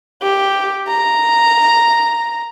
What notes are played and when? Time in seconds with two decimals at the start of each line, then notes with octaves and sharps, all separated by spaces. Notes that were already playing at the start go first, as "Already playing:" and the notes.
0.22 G4
0.88 A#5